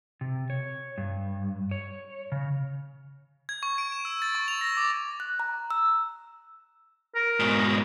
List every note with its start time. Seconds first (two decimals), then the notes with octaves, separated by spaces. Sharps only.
0.21 C3
0.50 C#5
0.98 G2
1.71 C#5
2.32 C#3
3.49 G#6
3.63 C#6
3.78 D7
3.92 E7
4.05 E6
4.22 A6
4.35 C#6
4.48 F7
4.61 A#6
4.77 D6
5.20 F#6
5.40 A#5
5.71 E6
7.15 A#4
7.40 G#2 B2